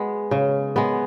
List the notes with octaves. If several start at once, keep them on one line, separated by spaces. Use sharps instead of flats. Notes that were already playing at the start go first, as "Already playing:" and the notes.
Already playing: G#3 B3
C#3
G#3 B3